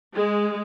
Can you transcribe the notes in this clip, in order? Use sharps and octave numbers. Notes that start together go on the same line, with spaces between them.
G#3